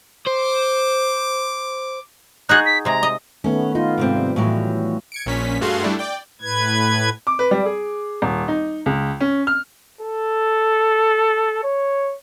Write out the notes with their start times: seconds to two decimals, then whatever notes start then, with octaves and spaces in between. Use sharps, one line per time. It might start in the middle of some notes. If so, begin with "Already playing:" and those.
0.27 C5 D6
2.49 D#4 F#4 G#4 F#6
2.66 B6
2.85 C3 G#3 A#5
3.03 D#5
3.44 D#3 A3 B3 C#4
3.75 D#4 F4
3.98 G#2 C3 C4
4.16 G3
4.36 A2 E3 F#3
5.12 G#6 C#7 D7
5.26 A#1 A#2 C#4 B6
5.61 G2 A3 F#4 G#4 F5 C6
5.83 G3 A3 D4 E4
5.99 D5 G5
6.42 A2 B4 G#6
7.27 D6
7.39 B4
7.51 G3
7.66 G#4
8.22 D#1
8.48 D#4
8.86 C#2
9.20 C#4
9.47 F6
10.01 A4
11.64 C#5